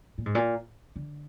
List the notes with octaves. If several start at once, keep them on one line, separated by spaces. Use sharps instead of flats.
A#2
G#2
A#2
D3